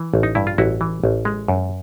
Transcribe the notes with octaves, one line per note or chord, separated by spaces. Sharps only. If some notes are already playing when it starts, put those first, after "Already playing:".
Already playing: E3
A1
D#4
G2 E4
F4
A1 E4 F#4
E3
A1
G#3
F#2